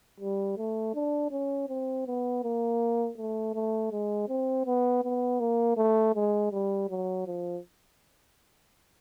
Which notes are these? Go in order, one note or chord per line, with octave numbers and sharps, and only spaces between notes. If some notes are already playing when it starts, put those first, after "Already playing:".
G3
A3
D4
C#4
C4
B3
A#3
A3
A3
G#3
C4
B3
B3
A#3
A3
G#3
G3
F#3
F3